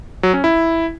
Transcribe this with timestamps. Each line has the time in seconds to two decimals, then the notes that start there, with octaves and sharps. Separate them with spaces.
0.23 F#3
0.34 C#4
0.44 E4